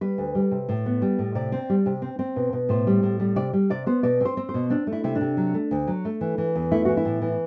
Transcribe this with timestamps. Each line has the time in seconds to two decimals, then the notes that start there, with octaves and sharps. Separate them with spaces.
0.01 G3 B4
0.18 D2
0.35 G3
0.51 C3
0.69 A2
0.86 B3
1.02 G3
1.18 A2
1.35 C3 D5
1.52 C4
1.70 G3
1.86 C3
2.02 C4
2.19 C4
2.36 B2
2.53 B2
2.69 A2 C5
2.87 G3
3.03 A2
3.20 G3
3.36 C3 D5
3.53 G3
3.70 C3 D5
3.86 B3 C5
4.03 B2 D5
4.20 C4 C5
4.37 C4
4.49 C5
4.54 B2
4.70 C4 D4
4.87 A3
4.92 E4
5.04 C3 E4
5.15 D4
5.21 C3
5.37 F#3
5.54 A3
5.71 D2
5.87 F#3
6.05 A3
6.21 E3
6.38 E3
6.55 E2
6.71 A3 E4
6.85 E3 F#4
6.97 E4
7.05 A2
7.22 E3